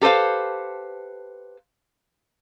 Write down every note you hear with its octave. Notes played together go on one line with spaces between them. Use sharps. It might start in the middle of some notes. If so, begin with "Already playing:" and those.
G4 A4 B4 C5 F5